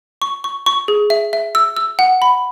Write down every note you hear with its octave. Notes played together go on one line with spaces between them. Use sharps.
C#6
C#6
C#6
G#4
E5
E5
E6
E6
F#5
B5